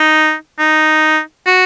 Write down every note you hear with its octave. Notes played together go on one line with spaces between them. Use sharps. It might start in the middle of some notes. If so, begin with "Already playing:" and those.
Already playing: D#4
D#4
F#4